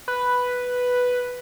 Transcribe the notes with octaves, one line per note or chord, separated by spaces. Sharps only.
B4